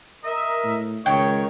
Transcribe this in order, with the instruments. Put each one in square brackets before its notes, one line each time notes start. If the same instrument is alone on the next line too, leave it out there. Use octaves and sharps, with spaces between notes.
[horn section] A#4 D#5 E5
[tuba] A2
[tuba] C#2 [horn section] D#3 C#5 [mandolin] G5